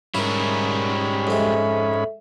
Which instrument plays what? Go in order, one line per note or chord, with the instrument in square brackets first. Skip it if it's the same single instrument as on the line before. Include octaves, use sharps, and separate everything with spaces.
[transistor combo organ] G#2 C#4 B5 [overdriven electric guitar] G3 A#4 [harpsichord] E4
[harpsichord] F2 G#3 [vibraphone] A4 E5